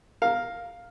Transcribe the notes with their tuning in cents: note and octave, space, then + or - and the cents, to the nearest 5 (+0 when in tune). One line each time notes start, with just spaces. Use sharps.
A#4 +0 F5 +5